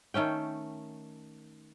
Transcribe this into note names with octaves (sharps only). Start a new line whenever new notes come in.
D#3 A3 C#4 G5